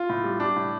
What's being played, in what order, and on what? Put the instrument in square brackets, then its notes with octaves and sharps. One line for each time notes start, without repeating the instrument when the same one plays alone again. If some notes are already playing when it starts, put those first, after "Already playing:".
Already playing: [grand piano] F4
A2
G3
G3 D4
A2